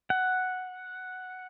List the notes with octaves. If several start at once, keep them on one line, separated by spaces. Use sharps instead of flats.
F#5